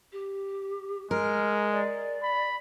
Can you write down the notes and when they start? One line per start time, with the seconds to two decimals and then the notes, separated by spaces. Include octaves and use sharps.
0.12 G4
1.11 G#3 A#4 F6
1.72 D5
2.23 B5